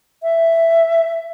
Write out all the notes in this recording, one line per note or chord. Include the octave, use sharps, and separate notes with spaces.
E5